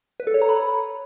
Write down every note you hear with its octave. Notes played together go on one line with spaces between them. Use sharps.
B4
A4
C#5
A#5
B5